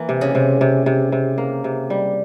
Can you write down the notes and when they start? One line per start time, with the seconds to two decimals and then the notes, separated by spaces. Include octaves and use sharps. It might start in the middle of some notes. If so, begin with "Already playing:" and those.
Already playing: E3 A#3
0.09 C3
0.21 C#3
0.35 C3
0.61 C3
0.86 C3
1.12 C3
1.38 A#3
1.64 C3
1.90 G3